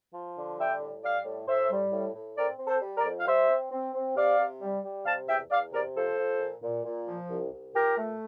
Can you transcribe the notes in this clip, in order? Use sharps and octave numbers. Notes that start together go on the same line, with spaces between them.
F3
D3
G3 E5 G5
A2
G3 D5 F5
A2
A2 C5 E5
G3
A2
A2
C4 A#4 D5
C4
A4 C5
G3
A#4 D5
F2
F5
G3 C5 E5
C4
C4
C4
C3 D5 F5
C3
G3
G3
C3 F5 A5
E2 E5 G5
E2 D5 F5
C3 A#4 D5
F3 A4 C5
F3
A#2
A#2
A#2
F3
C2
C2
A#2 G4 A#4
A3